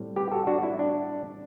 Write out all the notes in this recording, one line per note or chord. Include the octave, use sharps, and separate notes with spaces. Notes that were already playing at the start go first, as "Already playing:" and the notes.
Already playing: A2 G3 C4
G4 B4
F#4 A4
D4 F#4
E4
D4